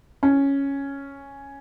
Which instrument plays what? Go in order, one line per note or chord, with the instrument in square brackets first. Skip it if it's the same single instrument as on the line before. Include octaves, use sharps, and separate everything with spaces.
[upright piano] C#4